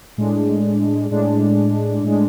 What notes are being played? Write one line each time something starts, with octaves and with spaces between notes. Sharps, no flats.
A2 G#3 D4
A2 G#3 D4
A2 G#3 D4